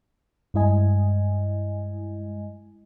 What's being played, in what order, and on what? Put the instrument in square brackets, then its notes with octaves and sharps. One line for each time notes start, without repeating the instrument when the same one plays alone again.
[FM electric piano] G2 G#3 E4 D#5 G#5